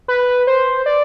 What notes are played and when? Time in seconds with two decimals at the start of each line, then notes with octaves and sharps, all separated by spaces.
0.08 B4
0.47 C5
0.86 D5